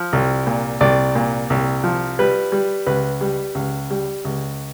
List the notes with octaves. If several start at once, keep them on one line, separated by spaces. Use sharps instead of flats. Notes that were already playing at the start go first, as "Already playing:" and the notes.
Already playing: F3
C2
A#2
C2 D5
A#2
C2
F3
G3 B4
G3
C#2 B4
G3
C#2
G3
C#2